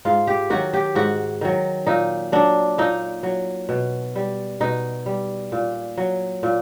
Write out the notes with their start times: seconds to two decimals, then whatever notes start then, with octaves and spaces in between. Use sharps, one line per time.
0.05 G#2 F4
0.27 G4
0.50 D#3 F#3 F#4
0.74 G4
0.95 G#2 F#4
1.41 D#3 F#3
1.87 A#2 D#4
2.32 F#3 D4
2.78 A#2 D#4
3.23 F#3
3.69 B2
4.15 G3
4.60 B2 D#4
5.06 G3
5.52 A#2
5.98 F#3
6.43 A#2